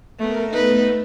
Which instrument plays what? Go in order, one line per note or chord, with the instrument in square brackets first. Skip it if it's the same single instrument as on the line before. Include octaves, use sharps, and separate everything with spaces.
[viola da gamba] A3 B3 [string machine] A#4
[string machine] A3 B3 [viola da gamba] D#4 B4